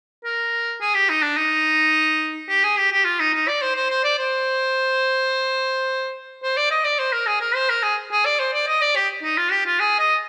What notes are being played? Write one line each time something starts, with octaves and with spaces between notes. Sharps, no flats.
A#4
G#4
G4
D#4
D4
D#4
G4
G#4
G4
G4
F4
D#4
D#4
D5
C5
C5
C5
D5
C5
C5
D5
D#5
D5
C5
A#4
G#4
A#4
C5
A#4
G#4
G#4
D5
C5
D5
D#5
D5
G4
D#4
F4
G4
F4
G#4
D#5